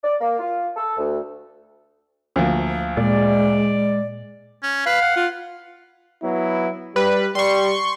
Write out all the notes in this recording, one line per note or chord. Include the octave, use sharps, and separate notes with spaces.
D5
A#3
F4
A4
D2
D2 F3 A#3
A#2 G#3 D5
C#4
B4 F5
F#5
F4
F#3 B3 E4
G3 B4
G3 C6 C#6